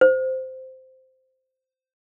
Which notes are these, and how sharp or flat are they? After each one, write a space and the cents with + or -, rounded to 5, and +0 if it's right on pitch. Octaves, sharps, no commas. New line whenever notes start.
C5 -10